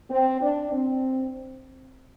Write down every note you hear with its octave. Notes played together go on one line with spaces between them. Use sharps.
C4
D4
C4